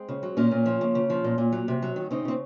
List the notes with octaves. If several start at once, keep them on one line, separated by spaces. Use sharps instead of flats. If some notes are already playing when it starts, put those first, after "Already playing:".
Already playing: G#3 C4
C#3
F#3
A#2 A#3 C#4
A#2
F3
C#3
C#3
F3
A#2
A#2
F#3
C3
F#3
D#3
C#3 C4 D#4
C#3 C4